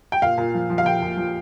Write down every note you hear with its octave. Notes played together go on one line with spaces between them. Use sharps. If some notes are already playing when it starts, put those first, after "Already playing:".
G5
A#2 F5
A#2
F3
F3
F5
A#2 G5
A#2
F3